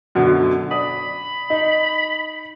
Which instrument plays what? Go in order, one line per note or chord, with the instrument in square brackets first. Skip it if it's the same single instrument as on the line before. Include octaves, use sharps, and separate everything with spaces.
[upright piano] F#2 B2 D3
[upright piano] D5 D#6 [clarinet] B5
[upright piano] D#4